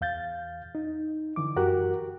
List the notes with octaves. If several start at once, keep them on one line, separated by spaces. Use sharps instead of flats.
E2 F5 G6 A6
D#4
D3 E3 D6
F#2 F#4 G4 A#4 F#6